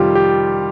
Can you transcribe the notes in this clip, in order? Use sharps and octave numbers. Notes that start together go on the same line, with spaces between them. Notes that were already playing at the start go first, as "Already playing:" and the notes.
Already playing: F2 C3 D#3 G3 F4 G4
G4